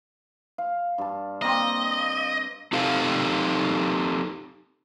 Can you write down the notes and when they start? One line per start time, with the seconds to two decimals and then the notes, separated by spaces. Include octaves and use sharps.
0.58 F5
0.98 G2 A5
1.42 A#3 C4 D#5
2.73 C4 D#4 G4 A4 C5 F5